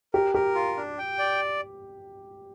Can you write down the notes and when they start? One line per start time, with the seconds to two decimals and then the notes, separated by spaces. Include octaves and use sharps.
0.14 G4 A#4
0.34 G4 A#4
0.55 F4
0.76 D4
0.98 G5
1.19 D5